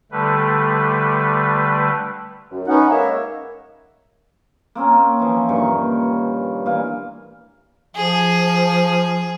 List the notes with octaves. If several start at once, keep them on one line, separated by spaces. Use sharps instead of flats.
D3 G3 A3 B4
F#2
B3 C#4 D#4 F#5
G#3 A#3 C#5 E5
A#3 C4 C#4
E3 F3
G2 A#2 D#3 C#6
A#2 E3 F5
F3 G#4